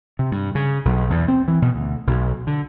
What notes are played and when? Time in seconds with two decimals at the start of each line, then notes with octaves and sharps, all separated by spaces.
0.19 C3
0.32 G2
0.55 C#3
0.85 B1
1.10 E2
1.28 C4
1.48 E3
1.62 B2
1.74 D2
2.07 B1
2.47 D3